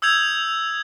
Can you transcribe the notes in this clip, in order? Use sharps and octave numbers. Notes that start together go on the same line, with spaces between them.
D#6 E6 G6 G#6 F7